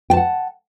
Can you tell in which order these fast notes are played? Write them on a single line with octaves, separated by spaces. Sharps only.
G5 A5 F#5